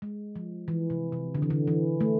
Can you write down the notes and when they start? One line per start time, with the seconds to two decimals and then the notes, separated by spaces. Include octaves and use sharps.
0.02 G#3
0.36 F3
0.68 E3
0.90 C3
1.12 C3
1.35 D3
1.42 E3
1.50 D3
1.67 E3
2.01 A3